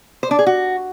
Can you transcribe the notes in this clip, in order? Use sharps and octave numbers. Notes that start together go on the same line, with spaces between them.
C5
D4
G#4
F#4